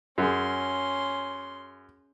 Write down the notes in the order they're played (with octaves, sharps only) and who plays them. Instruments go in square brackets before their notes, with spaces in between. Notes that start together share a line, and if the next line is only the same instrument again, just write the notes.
[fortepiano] F#2 G#4 [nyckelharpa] C#4 C6